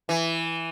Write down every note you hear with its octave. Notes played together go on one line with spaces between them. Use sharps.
E3